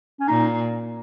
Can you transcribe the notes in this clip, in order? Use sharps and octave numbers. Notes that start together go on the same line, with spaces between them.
C#4
A#2 D#4